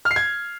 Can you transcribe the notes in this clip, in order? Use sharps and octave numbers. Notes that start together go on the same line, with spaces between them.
F6
C7
G#6